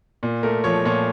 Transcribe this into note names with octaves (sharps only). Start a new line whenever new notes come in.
A#2
A3 A#4
F3 C#5
A#2 C#5